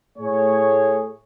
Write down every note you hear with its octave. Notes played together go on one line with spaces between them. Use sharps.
A2 A3 G#4 C#5